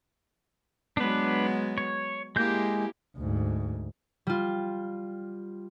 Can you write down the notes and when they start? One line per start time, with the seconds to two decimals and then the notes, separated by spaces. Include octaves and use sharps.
0.97 F#3 G#3 B3 D4 B4
1.78 C#5
2.36 G#3 A#3 E4 G4 G6
3.18 D2 G#2
4.27 G3 F4